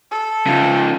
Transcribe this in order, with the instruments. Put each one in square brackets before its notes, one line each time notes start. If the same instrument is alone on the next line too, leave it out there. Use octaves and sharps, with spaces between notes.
[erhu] A4
[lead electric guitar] C#3 F3